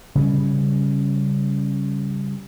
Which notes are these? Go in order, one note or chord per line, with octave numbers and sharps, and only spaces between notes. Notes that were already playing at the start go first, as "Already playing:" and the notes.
C#3 G3 C#4